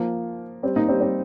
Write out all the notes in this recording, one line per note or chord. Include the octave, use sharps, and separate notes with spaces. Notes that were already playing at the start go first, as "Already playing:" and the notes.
Already playing: F3 A#3
G3 C4
A#3 D#4
G3 C4
G3 C4